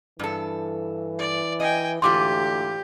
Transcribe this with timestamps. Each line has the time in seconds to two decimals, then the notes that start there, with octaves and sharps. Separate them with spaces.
0.19 G2 E3 A4
1.19 D5
1.60 D#5 G5 G#5
2.02 D2 G#2 E3 F4 G4 C6 D6